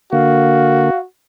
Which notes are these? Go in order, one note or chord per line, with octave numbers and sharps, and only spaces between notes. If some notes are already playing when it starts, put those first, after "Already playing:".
D3 A#3 F#4 F5